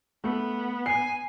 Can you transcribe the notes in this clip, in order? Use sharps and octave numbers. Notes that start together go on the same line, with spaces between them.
A3 B3
G#5 C7